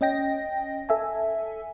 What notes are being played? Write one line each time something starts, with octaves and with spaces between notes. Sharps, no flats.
C#4 D#5 G5 A#6
A4 E5 G#5